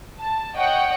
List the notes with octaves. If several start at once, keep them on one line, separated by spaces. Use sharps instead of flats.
A5
C#5 D#5 F#5 G5